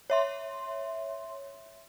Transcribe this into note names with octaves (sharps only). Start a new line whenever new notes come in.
C#5 E5 C6